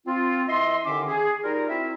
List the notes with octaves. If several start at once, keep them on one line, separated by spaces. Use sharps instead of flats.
C4 F4
E3 D#5 E5 C6
D#2 D3 D#3 C#4 E5 D6
G#4
G3 D#4 F4 A#4
C4 E4 F#4 E5